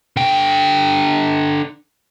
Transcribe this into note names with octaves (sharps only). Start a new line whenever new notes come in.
D3 G5